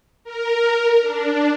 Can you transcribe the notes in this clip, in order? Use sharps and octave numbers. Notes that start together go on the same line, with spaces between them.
A#4
D4